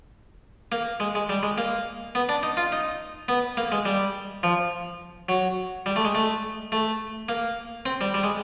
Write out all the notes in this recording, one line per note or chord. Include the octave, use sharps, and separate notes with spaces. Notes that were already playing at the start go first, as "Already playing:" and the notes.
A#3
G#3
G#3
G3
G#3
A#3
B3
D4
D#4
F4
D#4
B3
A#3
G#3
G3
F3
F#3
G3
A3
G#3
A3
A3
A#3
C4
G3
G3
G#3